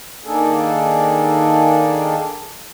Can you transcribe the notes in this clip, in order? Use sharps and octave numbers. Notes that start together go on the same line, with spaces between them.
D#3 A#3 D4 G#4 A4